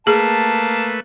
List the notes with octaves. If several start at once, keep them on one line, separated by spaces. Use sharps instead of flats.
A3 A#3 G#4 B4 A5